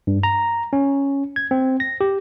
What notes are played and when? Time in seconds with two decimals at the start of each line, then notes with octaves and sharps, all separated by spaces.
0.07 G2
0.23 A#5
0.73 C#4
1.36 G#6
1.51 C4
1.80 A#6
2.01 G4